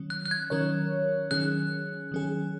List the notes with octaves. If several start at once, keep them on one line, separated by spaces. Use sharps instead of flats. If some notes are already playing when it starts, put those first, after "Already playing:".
Already playing: D#3 F#3 C#4
F#6
F#6
G#6
D#3 F#3 C#4 A#4 C#5
D#3 F#3 C#4 G#4 F#6
D#3 F#3 C#4 G#4